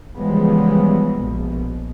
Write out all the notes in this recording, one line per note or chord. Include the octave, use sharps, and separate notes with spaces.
C#3 E3 F3 G3 G#3 B3
A#1 B2